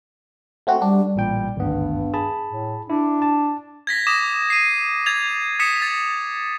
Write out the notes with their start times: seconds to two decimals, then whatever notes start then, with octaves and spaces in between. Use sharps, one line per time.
0.67 A3 C4 F#4
0.82 G3 D4
1.16 A1 A#2 G3 G5
1.56 G#1 D2 G2 B3
2.14 G#4 A5 B5
2.49 A2
2.90 D4 E4
3.22 A5
3.87 G#6 A#6 B6
4.07 D6 D#6 G#6 A#6 E7
4.50 C7 D#7
5.06 G#6 A6 F7
5.59 D#6 B6 C#7 E7
5.82 A6